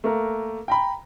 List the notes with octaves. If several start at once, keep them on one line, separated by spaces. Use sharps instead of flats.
A3 A#3 A#4
G5 A#5 B5